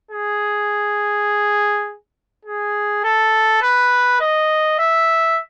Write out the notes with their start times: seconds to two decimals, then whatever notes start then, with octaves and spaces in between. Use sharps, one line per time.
0.11 G#4
2.45 G#4
3.04 A4
3.62 B4
4.20 D#5
4.79 E5